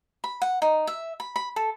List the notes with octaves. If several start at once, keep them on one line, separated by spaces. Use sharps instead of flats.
B5
F#5
D#4
E5
B5
B5
A4